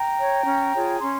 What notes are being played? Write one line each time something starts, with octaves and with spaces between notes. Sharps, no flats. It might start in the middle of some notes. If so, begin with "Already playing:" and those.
Already playing: G5 A#5
C#5
C#4
F4 G#4 C#5
C#4 G#5 C6